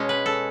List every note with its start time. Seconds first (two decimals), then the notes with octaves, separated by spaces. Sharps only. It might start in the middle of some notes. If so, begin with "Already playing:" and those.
Already playing: B2 G#3 C#4
0.09 B4
0.26 A4